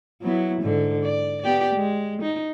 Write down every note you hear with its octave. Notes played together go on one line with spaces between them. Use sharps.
F#3 B3 E4
G#2 D3
D5
B3 G4 D5
G#3
D#4